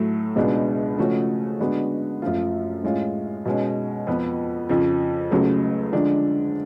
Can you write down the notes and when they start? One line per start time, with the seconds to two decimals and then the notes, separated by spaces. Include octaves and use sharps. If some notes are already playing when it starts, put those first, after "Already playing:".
Already playing: A2 F#3 A3
0.36 C#2 B2 G#3 B3 D4
0.98 C#3 F3 A3 C#4 F#4
1.60 D3 G#3 B3 D4 F#4
2.22 F#2 F3 A3 F4
2.84 A2 G#3 C#4 F4
3.45 B2 G#3 C#4
4.07 F2 F3 B3
4.69 F2 C#3 F3
5.31 C#2 C#3 F#3 A3
5.92 D3 F3 G#3 D4